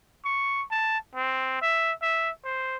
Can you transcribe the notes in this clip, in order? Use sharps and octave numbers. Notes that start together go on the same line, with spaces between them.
C#6
A5
C4
E5
E5
C5